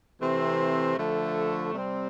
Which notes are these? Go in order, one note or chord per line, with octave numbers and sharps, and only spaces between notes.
C3 E3 A3 C4
D3 F3 A3
C3 G3 C4